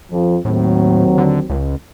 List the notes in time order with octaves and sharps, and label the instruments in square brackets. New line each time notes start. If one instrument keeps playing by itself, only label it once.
[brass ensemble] F2 F3
[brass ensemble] D#2 F#3 C4 [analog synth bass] A2
[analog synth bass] D3
C#2